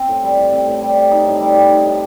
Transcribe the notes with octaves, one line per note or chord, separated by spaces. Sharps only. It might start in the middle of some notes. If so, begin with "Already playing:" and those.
Already playing: C4
A2
G3
A2
C4
A2
G3
G4
D#4
A2
G3
G4
D#4
A2